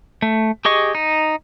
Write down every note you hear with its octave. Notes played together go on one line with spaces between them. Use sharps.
A3
G4 G#4 D#5 C#6
D#4